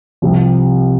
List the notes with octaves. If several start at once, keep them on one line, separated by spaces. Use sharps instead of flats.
C2 C3 F3